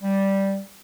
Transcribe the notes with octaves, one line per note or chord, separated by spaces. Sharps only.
G3